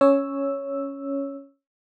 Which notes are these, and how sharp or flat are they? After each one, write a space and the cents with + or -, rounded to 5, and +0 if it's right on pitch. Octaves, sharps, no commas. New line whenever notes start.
C#4 +0 C#5 +0 E6 +0